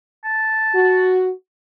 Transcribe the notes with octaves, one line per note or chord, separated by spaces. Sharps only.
A5
F#4